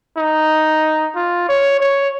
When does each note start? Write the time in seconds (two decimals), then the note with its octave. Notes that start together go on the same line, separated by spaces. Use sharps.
0.18 D#4
1.16 F4
1.49 C#5
1.80 C#5